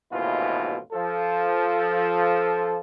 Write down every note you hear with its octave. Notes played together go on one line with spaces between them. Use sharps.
A1 D#2 G#2 B2 E4 F4
F3 A4